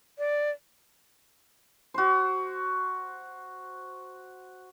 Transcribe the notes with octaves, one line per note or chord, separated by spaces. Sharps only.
D5
F#4 C5